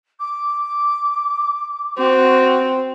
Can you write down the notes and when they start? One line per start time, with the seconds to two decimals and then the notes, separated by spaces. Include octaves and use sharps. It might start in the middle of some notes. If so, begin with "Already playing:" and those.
0.19 D6
1.98 C4 F#4